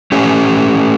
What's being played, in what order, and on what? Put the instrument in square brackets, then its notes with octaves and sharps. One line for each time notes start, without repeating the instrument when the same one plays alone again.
[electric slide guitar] A3 C#4 G4 B4